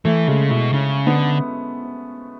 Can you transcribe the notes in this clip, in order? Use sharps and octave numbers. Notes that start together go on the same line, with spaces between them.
E3 A3
C#3 G#3
B2 E4
C#3 C#4
D3 B3